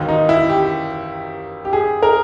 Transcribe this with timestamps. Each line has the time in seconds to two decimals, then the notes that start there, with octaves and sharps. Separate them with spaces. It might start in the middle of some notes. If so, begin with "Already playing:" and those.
Already playing: E1 D#2 D#3
0.08 D#4
0.29 E4
0.50 G4
1.65 G4
1.73 G#4
2.03 A#4